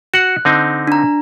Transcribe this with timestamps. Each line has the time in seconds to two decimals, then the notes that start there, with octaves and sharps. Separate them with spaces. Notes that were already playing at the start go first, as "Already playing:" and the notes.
0.14 F#4 F#5 F#6
0.45 D3 C4 D#4
0.87 D4 A#5